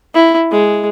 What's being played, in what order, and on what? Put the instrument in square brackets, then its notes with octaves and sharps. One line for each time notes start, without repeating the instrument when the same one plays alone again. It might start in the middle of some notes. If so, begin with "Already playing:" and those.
[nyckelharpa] E4
G#3